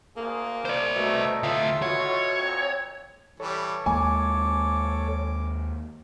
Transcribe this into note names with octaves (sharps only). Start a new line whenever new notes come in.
D2 A#3 G#4
F3 G#3 E4 C5 D5
B2 A3 D#4 A4 E5
D2 A2 F4 E5 F5
B2 E4 F#4 C#5
F2 A#2 C4
E3 G3 A4 C#5
D#2 G#3 A#3 G#5 D6